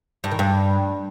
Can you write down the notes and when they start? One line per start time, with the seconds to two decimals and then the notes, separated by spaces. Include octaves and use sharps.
0.24 G2
0.31 D#3
0.39 G2